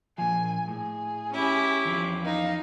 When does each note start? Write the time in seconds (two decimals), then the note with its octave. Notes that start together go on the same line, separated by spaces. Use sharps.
0.18 A#2 F3 G#5
0.68 A2 G#4
1.31 C#4 E4 G4
1.85 E2 F3
2.25 D#4 F5